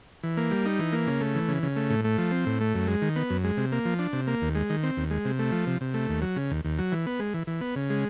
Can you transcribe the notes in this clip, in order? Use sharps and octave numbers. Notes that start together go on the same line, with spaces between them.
E3
A#3
G3
D#4
E3
A#3
C#3
A3
E3
C#3
C#3
A3
A2
A3
F3
C4
A2
A3
F#2
G#3
D#3
B3
F#2
G#3
C3
A#3
F3
D4
C3
A#3
D#2
G#3
D#3
C4
D#2
G#3
C3
A3
F3
C3
C3
A3
D#2
F#3
C#3
D#2
D#2
F#3
E3
B3
G#3
E3
E3
B3
C#3
G#3